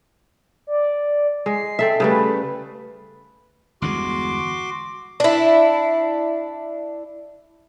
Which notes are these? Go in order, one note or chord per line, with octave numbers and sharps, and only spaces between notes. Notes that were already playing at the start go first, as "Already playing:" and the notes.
D5
G#3 C7
C4 A4 E5
C#3 G3 A3 B4
G1 E2 G#3 F#4 C6 D6
D4 E4